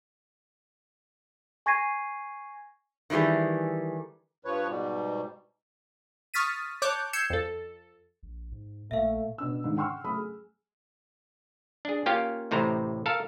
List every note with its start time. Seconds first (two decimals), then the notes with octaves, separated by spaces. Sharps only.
1.66 G#5 C#6 G#6 A#6 C7 D#7
3.10 D#3 E3 G3 G#4 A4
4.45 G2 F3 B4 C#5
4.68 G#2 B2 G3
6.34 C#6 D#6 F6 A6 B6 D#7
6.82 C#5 A5 D6 F#6 G6
7.13 E6 G6 G#6 C7 C#7 E7
7.30 F2 A4
8.23 A#1
8.52 G#2
8.91 A#1 A#2 A3 E5 F5
9.38 B2 D4 E6
9.64 G#2 D3 D#3
9.77 F#5 G5 C6 C#6 E6 F6
10.04 F#3 A3 B5 D#6
10.16 G#4
11.85 D4 G#4
12.06 A#3 C#4 F4 G4 F5 G5
12.51 A1 A2 C3 C5 A#5
13.06 A4 A#4 F5 A5